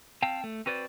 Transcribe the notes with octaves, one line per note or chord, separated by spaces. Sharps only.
C4 F5 G5 A5
A3
C4 F#4 B4 C5 D5